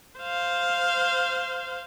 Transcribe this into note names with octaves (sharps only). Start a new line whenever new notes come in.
C5 F5